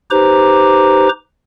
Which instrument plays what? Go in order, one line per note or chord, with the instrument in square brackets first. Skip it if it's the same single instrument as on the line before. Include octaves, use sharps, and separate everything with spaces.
[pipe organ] D#4 G4 B4 C5 A#5 D6